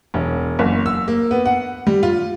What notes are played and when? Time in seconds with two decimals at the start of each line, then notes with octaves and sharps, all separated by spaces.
0.14 E1
0.59 F#1
0.86 E6
1.08 A#3
1.31 B3
1.46 F#5
1.87 G3
2.03 F4